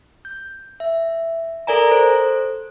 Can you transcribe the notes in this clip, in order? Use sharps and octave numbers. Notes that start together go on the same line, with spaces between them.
G6
E5
A4 A#4 D5 G#5 A#5
A4 C5